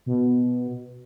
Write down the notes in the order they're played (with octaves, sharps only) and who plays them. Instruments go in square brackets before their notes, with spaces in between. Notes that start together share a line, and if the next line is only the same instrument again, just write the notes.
[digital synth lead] B2